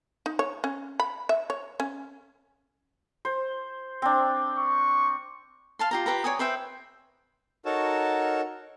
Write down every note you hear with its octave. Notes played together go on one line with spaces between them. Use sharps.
D#4
C#5
C#4
B5
E5
C#5
C#4
C5
C4 D4
C#6
F5 A5 C6
F4 G4 A#5
F4 G4 B4 A#5
C#5 D5 G#5 D#6
B4 C5 E5 G5
D#4 F#4 A4 A#4 C#5 A5